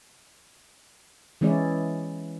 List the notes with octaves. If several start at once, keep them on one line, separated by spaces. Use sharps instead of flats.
E3 G#3 C#4 E4 D5